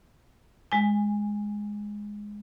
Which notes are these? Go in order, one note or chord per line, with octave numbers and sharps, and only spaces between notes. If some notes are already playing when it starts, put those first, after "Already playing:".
G#3 G#5